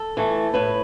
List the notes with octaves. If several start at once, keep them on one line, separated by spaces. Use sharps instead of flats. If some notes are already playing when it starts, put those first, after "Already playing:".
Already playing: A4
E3 A3
A2 B4